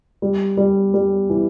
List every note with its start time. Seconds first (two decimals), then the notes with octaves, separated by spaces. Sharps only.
0.22 G3
0.57 G3
0.94 G3
1.30 E3